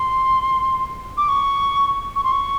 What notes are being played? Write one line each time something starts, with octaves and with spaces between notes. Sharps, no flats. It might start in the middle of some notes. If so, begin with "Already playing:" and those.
Already playing: C6
D6
C#6
C#6
C6
C#6